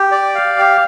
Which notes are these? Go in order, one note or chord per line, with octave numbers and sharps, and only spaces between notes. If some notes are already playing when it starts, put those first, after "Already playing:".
Already playing: G4
D5
F5
G4